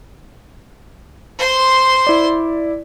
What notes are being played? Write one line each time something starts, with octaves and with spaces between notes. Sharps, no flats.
C5 C6
E4 D5